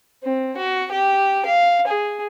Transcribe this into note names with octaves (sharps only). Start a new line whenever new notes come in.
C4
F#4
G4
F5
G#4